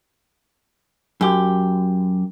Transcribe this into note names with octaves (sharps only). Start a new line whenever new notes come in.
F#2 G4